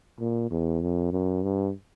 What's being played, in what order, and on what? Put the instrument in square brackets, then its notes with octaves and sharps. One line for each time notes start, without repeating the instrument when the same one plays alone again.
[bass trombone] A#2
E2
F2
F#2
G2